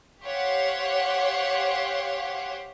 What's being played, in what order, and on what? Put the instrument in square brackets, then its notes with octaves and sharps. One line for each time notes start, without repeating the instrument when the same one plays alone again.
[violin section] G4 C5 C#5 F5 F#5